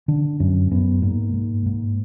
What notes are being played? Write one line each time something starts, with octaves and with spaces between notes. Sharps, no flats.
D3 D4
F#2 C#4
F#2 B3
G#2 A#3
G#2
G#2